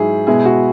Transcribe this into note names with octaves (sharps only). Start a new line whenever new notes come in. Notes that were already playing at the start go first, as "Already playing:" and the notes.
Already playing: G#2 F#3 E4 G#4
B2 G#3 B3 E4 G#4
F#4